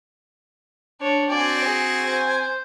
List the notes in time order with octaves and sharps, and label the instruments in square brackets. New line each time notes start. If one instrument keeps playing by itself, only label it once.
[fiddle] D4 C#5
[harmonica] C4 F#4 G#5 [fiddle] D5
[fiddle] G#4
C5